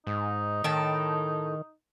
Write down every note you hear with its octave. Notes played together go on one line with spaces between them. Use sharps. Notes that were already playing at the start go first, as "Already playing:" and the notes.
G#2 D#4
A2 D#3 G5 A5